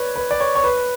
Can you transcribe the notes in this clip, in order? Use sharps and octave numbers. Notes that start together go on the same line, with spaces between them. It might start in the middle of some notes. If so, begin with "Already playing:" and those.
Already playing: B4 C#5 D5
B4
D5
C#5
C#5
B4